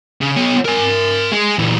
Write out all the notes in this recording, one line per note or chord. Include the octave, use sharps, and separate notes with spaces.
C#3
B3 C#5
A#4 G#5
G#3
A#2 E3